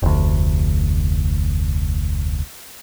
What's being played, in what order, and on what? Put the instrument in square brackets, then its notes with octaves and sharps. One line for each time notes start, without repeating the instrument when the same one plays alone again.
[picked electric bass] F1 D2